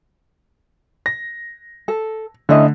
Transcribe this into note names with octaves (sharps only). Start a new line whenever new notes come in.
A#6
A4
D3 A3 C#4 E4 D#5